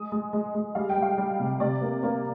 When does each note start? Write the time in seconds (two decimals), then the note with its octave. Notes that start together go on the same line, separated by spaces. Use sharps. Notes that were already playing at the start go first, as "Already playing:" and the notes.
Already playing: G#3 D#6
0.12 G#3
0.33 G#3
0.55 G#3
0.75 G3 F5
0.89 G5
0.97 G3
1.02 F5
1.18 G3
1.40 C3
1.60 C3 D5
1.81 A#3
2.03 A#3